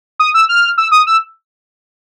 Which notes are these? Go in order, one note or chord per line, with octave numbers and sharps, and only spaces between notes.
D#6
E6
F6
E6
D#6
E6